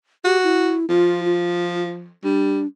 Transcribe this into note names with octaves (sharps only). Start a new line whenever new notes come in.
F#4 G4
E4
F3 F4
F4
G3 D4